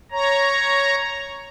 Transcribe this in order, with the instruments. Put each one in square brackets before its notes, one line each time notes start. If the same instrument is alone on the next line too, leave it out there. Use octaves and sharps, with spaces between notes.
[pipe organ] C#5 A#5